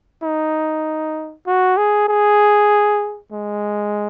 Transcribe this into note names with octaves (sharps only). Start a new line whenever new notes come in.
D#4
F#4
G#4
G#4
G#3